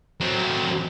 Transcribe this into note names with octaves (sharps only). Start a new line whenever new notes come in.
F#3 C4